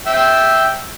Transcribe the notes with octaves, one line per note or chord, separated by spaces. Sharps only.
E5 G5